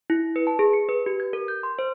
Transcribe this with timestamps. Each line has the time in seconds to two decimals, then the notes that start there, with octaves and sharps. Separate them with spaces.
0.10 E4
0.36 B4
0.47 A5
0.59 G#4
0.73 C#7
0.89 B4
1.06 G4
1.20 G#6
1.33 A#4
1.48 G6
1.63 C6
1.79 C5